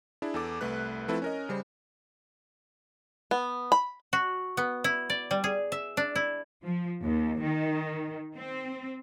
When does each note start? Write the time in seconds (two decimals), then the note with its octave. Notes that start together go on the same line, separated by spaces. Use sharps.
0.22 D4 E4 G#4
0.34 E2 A4 D6
0.61 C2 A3 B4 F#6
1.08 F3 A3 C4 E4 A4 B4
1.22 C#4 A#4 D#5
1.49 C#3 G3 C5
3.31 B3
3.72 B5
4.13 F#4
4.57 B3
4.84 E4
5.10 D5
5.31 G3
5.44 G#4
5.72 E5
5.97 D4
6.15 E4
6.65 F3
7.03 D#2
7.42 D#3
8.35 C4